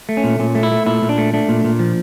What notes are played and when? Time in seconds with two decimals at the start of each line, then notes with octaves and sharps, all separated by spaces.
0.09 A3
0.17 C#4
0.24 A#2
0.39 A#2 C#4
0.55 A3
0.63 E4
0.72 A3
0.86 A#2 E4
1.02 A#2
1.09 D4
1.18 A3
1.34 A3 D4
1.49 A#2
1.64 A#2
1.79 F3